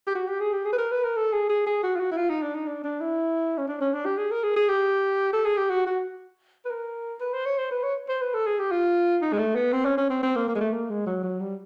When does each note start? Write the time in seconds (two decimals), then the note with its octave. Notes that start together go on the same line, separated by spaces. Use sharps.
0.07 G4
0.15 F#4
0.28 G4
0.41 G#4
0.53 G4
0.66 G#4
0.73 B4
0.79 A#4
0.92 B4
1.04 A#4
1.16 A4
1.33 G#4
1.49 G#4
1.67 G#4
1.83 F#4
1.96 F4
2.00 F#4
2.12 E4
2.17 F4
2.29 D#4
2.42 D4
2.55 D#4
2.67 D4
2.84 D4
3.01 E4
3.58 C#4
3.68 D4
3.81 C#4
3.93 D4
4.06 G4
4.18 G#4
4.31 A#4
4.44 G#4
4.56 G#4
4.69 G4
5.33 A4
5.45 G#4
5.57 G4
5.70 F#4
5.87 F#4
6.65 B4
6.70 A#4
7.20 B4
7.33 C5
7.46 C#5
7.58 C5
7.71 B4
7.83 C#5
8.09 C5
8.22 B4
8.34 A4
8.47 G#4
8.59 G4
8.72 F4
9.22 D#4
9.33 G#3
9.39 A3
9.56 B3
9.73 C4
9.85 C#4
9.98 C#4
10.10 C4
10.23 C4
10.36 A#3
10.48 A#3
10.55 G#3
10.61 A3
10.73 A#3
10.90 G#3
11.07 F#3
11.24 F#3
11.41 G3